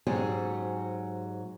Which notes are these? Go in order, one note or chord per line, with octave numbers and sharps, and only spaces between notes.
G#2 F#3 C4 C#4 G4 G#4